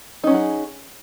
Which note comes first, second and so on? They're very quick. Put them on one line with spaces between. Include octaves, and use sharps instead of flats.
D#4 C#4 F#3 G#4